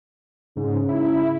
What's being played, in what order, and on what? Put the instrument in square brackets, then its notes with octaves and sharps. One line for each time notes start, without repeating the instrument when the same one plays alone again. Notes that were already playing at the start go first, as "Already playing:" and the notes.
[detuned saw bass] G#2 [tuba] C#3
[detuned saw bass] E4